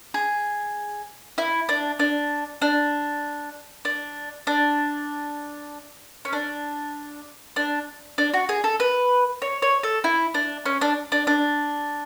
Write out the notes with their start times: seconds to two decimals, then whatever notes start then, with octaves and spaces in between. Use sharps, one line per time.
0.14 G#4
1.38 E4
1.69 D4
1.99 D4
2.62 D4
3.85 D4
4.47 D4
6.25 C#4
6.33 D4
7.56 D4
8.18 D4
8.34 F#4
8.49 G#4
8.64 A4
8.80 B4
9.42 C#5
9.62 C#5
9.83 A4
10.04 E4
10.34 D4
10.66 C#4
10.81 D4
11.12 D4
11.27 D4